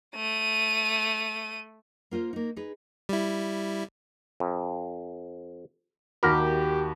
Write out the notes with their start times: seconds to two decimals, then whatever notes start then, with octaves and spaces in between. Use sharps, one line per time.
0.16 A3 D#7
2.11 A#3 F4 A#4 C5
2.33 A#3 D#4
2.56 D#4 G#4 B4
3.09 G3 E4
4.40 F2
6.23 D#2 F#4 G4 A#4 B5